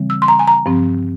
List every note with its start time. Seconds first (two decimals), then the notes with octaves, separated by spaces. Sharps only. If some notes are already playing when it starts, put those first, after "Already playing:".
Already playing: C#3 E3 G3 C4
0.10 E6
0.22 C6
0.28 A#5
0.39 G#5
0.47 A#5
0.66 G2 F3 C4